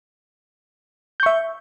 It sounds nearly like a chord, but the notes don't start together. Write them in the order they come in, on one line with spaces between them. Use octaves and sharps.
G6 C#6 E5